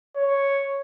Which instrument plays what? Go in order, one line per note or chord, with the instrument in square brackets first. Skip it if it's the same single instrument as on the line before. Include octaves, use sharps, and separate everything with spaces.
[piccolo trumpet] C#5